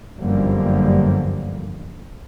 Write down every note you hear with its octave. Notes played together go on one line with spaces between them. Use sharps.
G1 F#2 D3 F3 G3 A#3